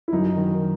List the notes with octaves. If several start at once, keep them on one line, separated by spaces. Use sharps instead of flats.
E4
F#2 D#4
D#3